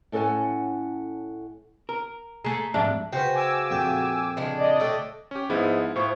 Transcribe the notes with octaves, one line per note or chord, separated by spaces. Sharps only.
A2 C#4 A4 C#5 F#5 G#5
A#4
A3 G#4 A#5
F2 G#2 D4 G4 G#4 E5 A5
C#3 F#4 B4 C5 G5
G#5 D6 E6
F2 A#2 G5
C#3 G#3 D4
D5 D#5
D3 A3 A4 C#5 G5
C#4 G4
G#2 F3 B3 E4
A2 F3 E4 C#6